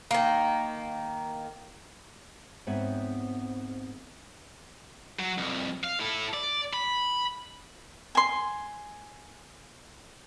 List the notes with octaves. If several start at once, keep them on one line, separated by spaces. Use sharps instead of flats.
D#3 A#3
G#2 B3 C4 C#5 E5
F#3
C2 F2
F5
E4 A4
D5
B5
G#5 C6